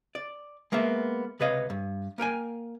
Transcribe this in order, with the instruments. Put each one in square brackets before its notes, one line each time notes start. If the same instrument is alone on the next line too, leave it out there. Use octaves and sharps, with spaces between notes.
[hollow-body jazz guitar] D5
G#3 A#3 B3 E5
C#2 C3 B4 C#5 D#5 F5
G2
A#3 A#4 G5 G#5